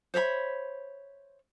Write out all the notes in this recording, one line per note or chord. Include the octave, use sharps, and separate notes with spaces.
C5 C#5 E5 B5